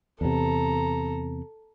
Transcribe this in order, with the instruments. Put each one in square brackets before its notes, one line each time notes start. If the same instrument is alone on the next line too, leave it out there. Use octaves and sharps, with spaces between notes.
[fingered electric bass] E2 C3 [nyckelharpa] A4 A#5